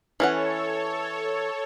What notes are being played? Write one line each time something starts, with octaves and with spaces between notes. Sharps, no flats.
E3 C#4 A4 C#5 F#5